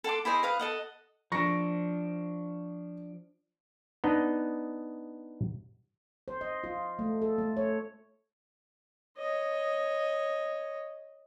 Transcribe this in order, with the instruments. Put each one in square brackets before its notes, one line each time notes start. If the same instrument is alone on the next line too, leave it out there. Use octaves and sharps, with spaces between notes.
[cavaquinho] A4 F#5 C6 D6
E4 G#4 C5 D#5
B4 F5 D#6
A4 D#5 F#5
[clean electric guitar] F3 D4 [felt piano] C#6 A#6
[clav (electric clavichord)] B3 D4 D#4 D#5
[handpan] C5
D#5
F4
A3
A4
A3
C#5
[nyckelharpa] C#5 D#5